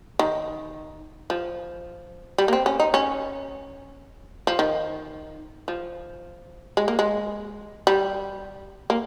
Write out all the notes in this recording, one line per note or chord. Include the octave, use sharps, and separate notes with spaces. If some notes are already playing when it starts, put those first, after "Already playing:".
D#3
F3
G3
A#3
C4
C#4
D#4
C#4
F3
D#3
F3
G#3
A#3
G#3
G3
A#3